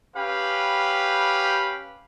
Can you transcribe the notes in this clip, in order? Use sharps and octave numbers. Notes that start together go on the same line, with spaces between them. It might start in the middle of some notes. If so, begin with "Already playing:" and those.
C#4 G4 B4 F5 G5 B5